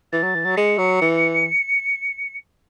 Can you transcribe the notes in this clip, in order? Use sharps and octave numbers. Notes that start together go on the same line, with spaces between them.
E3 A6
F#3
E3
F#3
G#3 C#7
F#3
E3